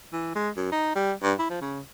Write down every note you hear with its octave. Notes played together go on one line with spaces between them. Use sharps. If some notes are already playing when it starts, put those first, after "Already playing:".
E3
G#3
F#2
D#4
G3
G2
E4
F3
C#3